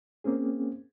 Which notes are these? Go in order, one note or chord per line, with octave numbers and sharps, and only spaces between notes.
A#3 C4 C#4 G#4